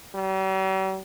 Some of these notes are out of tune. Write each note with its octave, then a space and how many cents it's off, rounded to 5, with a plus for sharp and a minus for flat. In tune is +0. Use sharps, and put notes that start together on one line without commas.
G3 -45